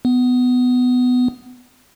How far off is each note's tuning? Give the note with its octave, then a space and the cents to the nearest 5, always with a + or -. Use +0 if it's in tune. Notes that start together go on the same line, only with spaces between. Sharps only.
B3 +15